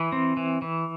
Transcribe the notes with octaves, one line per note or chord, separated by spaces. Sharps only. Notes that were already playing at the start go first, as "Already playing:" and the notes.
Already playing: E3 G#5 B5
C4
E3
E3